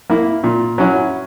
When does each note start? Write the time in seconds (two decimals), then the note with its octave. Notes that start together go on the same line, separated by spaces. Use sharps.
0.10 A#3 E4
0.44 A#2
0.78 F#3 C#4 E4